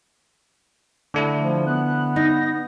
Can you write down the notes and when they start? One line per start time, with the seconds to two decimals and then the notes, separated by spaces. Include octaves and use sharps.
1.14 D3 A3 D4 E4
1.41 F3
1.66 B3 F#6
2.16 D#4 A#6